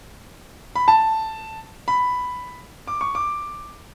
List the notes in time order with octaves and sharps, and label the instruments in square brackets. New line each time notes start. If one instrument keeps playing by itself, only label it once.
[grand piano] B5
A5
B5
D6
C#6
D6